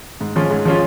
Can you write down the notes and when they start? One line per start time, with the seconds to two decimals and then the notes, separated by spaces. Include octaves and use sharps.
0.21 G#2
0.36 F3 G#3 C#4 F4
0.50 G#2
0.65 F3 G#3 C#4 F4